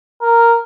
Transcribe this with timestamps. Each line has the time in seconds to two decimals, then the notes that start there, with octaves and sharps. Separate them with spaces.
0.22 A#4